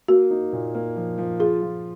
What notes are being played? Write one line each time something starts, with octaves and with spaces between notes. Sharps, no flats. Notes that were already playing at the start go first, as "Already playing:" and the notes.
A#3 F#4
D#4
A#2
A#3
F3
F3
F4 G#4
F3